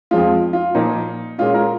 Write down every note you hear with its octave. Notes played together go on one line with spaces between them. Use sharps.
F2 F3 G#3 F4
F4
A#2 F3 A#3 D#4
A#2 G#3 C#4 F4
F4 A#4